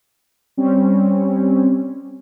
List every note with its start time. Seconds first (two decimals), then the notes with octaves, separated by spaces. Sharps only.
0.57 G3 C4 C#4